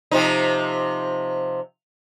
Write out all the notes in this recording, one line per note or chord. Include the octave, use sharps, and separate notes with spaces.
C3 F3 D#4